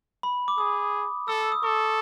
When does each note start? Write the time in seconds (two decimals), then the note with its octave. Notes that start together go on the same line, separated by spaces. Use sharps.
0.23 B5
0.48 D6
0.58 G#4 D#6
1.28 A4 E6
1.40 E6
1.52 D#6
1.63 A4 C#6